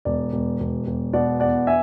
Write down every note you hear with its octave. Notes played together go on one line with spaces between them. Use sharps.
E1 D5
E1
E1
E1
B2 D5 F#5
E2 D5 F#5
E5 G#5